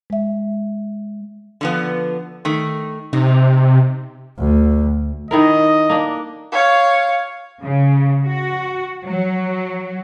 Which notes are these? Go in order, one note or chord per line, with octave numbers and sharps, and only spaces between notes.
G#3 E5
D3 F3 B3
D#3 A3
C3 D#4
D2
D#3 E4 A#4 D#5
A#3 D4
C#5 F5
C#3
F#4
F#3